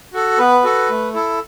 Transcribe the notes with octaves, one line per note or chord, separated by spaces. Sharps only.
F#4 A4
B3 B4
F#4 A4
A3
E4 A4